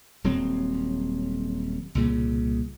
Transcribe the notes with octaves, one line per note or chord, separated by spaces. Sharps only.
D#1 F#3 C4
C2 A#2 C#3